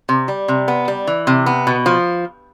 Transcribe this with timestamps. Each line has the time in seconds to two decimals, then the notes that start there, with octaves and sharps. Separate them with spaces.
0.09 C3
0.28 G3
0.48 C3
0.68 B3
0.88 G3
1.07 E3
1.27 C3
1.46 B3
1.67 B2
1.86 F3